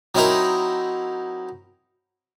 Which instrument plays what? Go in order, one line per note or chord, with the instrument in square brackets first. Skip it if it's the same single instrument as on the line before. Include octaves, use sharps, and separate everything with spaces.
[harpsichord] F#3 C4 D#4 E4 A#4 D#5